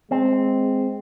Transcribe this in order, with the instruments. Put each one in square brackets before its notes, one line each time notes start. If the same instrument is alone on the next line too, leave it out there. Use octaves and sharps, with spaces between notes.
[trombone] G#3 [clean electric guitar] C4